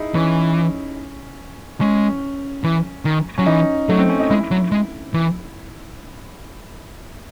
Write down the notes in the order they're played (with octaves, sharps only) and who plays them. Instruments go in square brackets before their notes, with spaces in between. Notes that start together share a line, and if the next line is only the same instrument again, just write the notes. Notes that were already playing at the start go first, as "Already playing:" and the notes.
Already playing: [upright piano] D#4 E4 G#4
[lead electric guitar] E3 [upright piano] C#4
[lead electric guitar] G#3 [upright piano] C#4
[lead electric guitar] E3
D#3
[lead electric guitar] F#3 [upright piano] C#4
[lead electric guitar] E3 [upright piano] D#4
[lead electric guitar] F#3 [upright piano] A3
[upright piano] C4
C#4
D#4
[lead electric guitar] G#3 [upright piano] E4
[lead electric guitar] F#3
G#3
E3